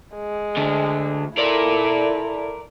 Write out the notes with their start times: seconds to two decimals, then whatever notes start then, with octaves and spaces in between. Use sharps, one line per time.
0.16 G#3
0.57 D2 D3
1.37 E4 A4 A#4 D5